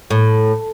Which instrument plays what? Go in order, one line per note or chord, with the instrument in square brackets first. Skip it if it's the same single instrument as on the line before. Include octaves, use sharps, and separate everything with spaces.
[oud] A2